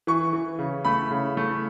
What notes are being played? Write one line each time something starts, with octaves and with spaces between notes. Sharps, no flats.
E3 C#6
E3
C#3
A3 B5
C#3
A3